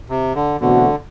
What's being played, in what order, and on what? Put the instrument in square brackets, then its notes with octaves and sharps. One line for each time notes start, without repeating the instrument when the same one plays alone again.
[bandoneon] C3
D3
[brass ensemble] E2 B2 A3 C4 F#4 [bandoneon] D3